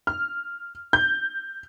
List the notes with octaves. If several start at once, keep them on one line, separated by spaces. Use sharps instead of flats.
F6
G6